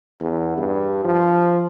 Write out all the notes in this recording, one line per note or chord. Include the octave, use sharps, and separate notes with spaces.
E2
G2
F3